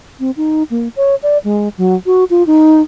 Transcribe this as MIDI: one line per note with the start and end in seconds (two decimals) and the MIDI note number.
0.20 0.31 60
0.37 0.63 63
0.70 0.88 58
0.96 1.15 73
1.23 1.38 74
1.44 1.69 56
1.78 1.95 54
2.06 2.24 66
2.30 2.46 65
2.47 2.81 63